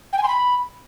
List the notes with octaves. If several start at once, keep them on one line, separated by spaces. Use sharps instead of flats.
G5
G#5
C6
B5